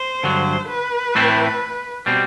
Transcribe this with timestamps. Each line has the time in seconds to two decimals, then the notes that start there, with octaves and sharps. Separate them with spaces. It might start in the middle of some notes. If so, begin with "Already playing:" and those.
Already playing: C5
0.23 G2 D3 F#3
0.69 B4
1.15 A2 E3 A3 C4 E4
2.06 B2 G3 C4